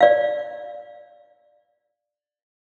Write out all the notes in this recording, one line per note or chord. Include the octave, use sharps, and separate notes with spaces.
D5 F5